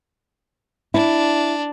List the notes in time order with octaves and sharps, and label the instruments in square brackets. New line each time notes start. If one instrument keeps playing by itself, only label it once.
[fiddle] D4 [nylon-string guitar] E4